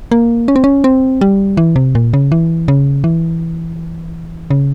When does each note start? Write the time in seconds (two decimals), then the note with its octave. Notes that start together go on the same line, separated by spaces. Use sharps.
0.11 A#3
0.48 C#4
0.56 C4
0.64 C#4
0.84 C4
1.21 G3
1.57 E3
1.76 C3
1.95 A#2
2.13 C#3
2.32 E3
2.68 C#3
3.04 E3
4.50 C#3